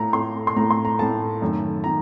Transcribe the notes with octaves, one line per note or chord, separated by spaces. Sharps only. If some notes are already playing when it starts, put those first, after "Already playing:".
Already playing: A2 A3 A#5
A2 A3 C6
C6
A2 A3 A#5
C6
A#5
A2 A3 A5
F#2 D#3 A3
D#3 A#5